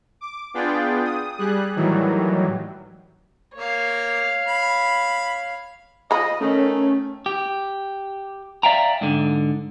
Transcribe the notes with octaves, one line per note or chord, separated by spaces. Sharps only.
D6
B3 D4 F4 G#4 D5 G5
D#6
G3 G#4 F#6
A2 D#3 E3 F#3 G3
A#3 C#5 F5
B5
F3 D#5 B5
D#3 A3 C#4
G4
D5 E5 F5 G5 G#5 A#5
G#2 D3